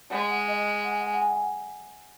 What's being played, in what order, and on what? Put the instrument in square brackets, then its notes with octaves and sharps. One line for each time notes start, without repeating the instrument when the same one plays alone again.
[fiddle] G#3 [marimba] F#5
[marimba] F#5
D#5
F#5
G#5
F#5
G#5
F#5
G#5
F#5
G#5
F#5